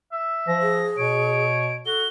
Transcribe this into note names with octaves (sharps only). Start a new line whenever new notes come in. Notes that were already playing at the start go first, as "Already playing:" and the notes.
E5
F3 A#6
G#4
B2 C#5 D7
F#4 A4 G7